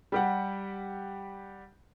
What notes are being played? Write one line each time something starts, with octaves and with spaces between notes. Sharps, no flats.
G3 G4 F#5